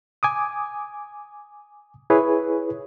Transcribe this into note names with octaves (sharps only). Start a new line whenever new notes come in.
G#5 D6 D#6
E4 G#4 B4 C#5